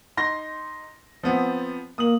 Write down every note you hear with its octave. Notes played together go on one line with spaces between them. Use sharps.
D#4 C6 A#6
F3 B3 C4
A#3 D#6 F#7